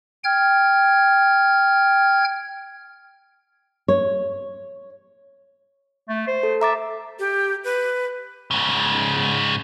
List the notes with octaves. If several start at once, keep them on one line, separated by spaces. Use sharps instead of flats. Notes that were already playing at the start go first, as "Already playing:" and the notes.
G5 F6 G#6
C#5
A3
C5
A4
E5 A#5 D6 A6
G4
B4
G#2 C#3